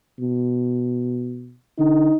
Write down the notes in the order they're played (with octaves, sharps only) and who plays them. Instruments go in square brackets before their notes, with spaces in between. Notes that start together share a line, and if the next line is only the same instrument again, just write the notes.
[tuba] B2
[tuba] D3 [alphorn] D#4